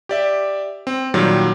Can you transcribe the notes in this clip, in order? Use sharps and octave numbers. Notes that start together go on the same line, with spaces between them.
G4 D5 E5
C4
A#2 D#3 F#3 G3